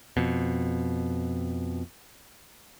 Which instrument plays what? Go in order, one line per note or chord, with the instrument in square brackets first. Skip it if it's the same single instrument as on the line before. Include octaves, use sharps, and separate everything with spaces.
[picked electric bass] F2 B2